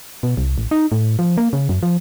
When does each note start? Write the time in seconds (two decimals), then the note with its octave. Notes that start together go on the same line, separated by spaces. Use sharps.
0.23 B2
0.37 C2
0.58 A1
0.71 D#4
0.92 A2
1.19 F3
1.38 A#3
1.53 C#3
1.69 F#2
1.83 F3